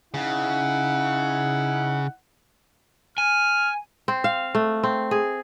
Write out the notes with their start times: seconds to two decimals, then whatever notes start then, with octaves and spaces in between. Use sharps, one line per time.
0.14 C#3 D#4 E4 F#5
3.18 G#5 F6
4.08 C4
4.24 F5
4.55 A3
4.84 C4
5.11 G#4